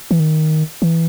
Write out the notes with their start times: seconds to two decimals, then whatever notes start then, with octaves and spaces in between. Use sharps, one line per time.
0.11 E3
0.20 D#3
0.82 E3